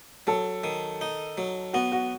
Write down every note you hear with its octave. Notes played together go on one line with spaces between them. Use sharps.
F#3 A4
D#3
D#4
F#3
B3 F#4
F#4